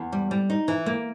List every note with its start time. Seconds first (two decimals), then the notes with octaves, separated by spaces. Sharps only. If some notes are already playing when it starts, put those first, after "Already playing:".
Already playing: E2
0.12 G3
0.31 G3
0.50 D#4
0.68 E3
0.86 A#3